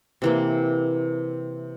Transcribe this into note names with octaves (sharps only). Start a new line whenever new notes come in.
C3 E3 A#3